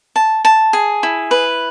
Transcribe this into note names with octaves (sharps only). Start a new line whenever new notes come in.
A5
A5
G#4
E4
B4